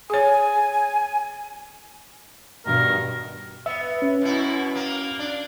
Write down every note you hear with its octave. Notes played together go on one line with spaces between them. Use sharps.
G#4 C#5 G#5
G2 B2 D#3 A#4
B3 E5
C#4
F#2 B2 E4
A#3
D4